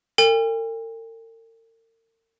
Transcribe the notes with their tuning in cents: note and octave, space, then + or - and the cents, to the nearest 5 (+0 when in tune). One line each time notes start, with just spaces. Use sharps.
A#4 -45 G5 +45